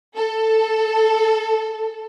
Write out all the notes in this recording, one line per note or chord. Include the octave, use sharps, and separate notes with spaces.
A4